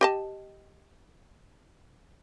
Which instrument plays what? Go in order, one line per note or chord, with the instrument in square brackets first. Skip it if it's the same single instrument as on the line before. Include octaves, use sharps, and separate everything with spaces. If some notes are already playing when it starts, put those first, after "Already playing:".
[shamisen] G4 D#5 A5